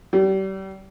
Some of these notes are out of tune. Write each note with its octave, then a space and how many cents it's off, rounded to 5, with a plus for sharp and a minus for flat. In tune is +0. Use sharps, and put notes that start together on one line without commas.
G3 -35